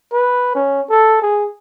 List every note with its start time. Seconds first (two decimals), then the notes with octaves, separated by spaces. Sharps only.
0.12 B4
0.55 C#4
0.90 A4
1.22 G#4